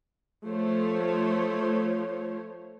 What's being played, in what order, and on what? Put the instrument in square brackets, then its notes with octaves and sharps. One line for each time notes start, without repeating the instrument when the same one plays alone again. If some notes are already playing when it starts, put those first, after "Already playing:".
[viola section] F3 A3 C5 C#5